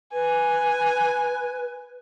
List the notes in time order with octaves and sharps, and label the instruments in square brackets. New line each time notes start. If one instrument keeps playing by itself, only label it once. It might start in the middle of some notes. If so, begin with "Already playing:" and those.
[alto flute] B4 [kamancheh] G#5